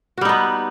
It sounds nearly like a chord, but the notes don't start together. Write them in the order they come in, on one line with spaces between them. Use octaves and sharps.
F#4 G3 D#4 B3